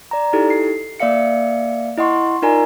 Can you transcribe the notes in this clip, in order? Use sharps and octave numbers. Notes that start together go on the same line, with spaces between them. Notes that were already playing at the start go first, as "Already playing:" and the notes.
D5 A#5
D#4 E4 G4 A4
C7
A#3 D5 E5 F5 C#7
E4 D#5 F#5 C6 C#6
D#4 F4 A#4 D5 G#5 A#5